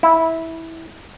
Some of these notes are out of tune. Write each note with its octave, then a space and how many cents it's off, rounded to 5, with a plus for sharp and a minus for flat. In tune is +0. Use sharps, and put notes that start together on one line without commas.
E4 -15